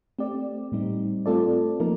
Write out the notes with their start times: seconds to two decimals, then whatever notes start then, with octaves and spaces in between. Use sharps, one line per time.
0.19 A3 C4 G4 D5
0.72 A2 G3 C4 D#4
1.26 A3 C4 F4 A4 D5
1.80 F3 A#3 D#4 A#4